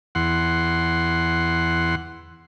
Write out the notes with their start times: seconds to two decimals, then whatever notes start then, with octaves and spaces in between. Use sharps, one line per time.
0.15 E2 F#5 C6